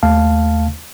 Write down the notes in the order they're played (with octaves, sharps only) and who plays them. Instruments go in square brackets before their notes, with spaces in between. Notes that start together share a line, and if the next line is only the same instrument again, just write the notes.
[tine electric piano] D#2 A3 F5 A5